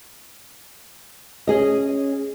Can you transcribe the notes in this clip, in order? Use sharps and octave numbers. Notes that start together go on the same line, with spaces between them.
C#4 G#4 D#5